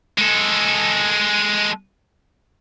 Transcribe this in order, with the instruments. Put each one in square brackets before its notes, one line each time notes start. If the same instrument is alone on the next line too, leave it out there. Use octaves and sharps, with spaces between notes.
[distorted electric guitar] G#3 A4